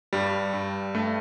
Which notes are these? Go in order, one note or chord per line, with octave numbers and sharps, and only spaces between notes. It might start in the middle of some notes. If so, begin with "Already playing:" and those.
G2 G3
G2
G2 A3